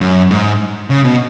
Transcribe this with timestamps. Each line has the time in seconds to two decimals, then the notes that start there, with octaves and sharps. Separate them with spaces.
0.01 F#2
0.31 G#2
0.90 C#3
1.05 B2